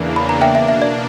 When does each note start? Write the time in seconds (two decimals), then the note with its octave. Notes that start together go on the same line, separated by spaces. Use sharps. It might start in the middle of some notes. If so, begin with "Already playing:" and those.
Already playing: E2 C#3 E3 A#3 D4
0.16 B5
0.29 A#5
0.41 B2 A#3 D4 E5 G5
0.55 E5
0.68 E5
0.82 D5